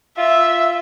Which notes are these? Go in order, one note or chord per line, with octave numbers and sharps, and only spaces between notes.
F4 E5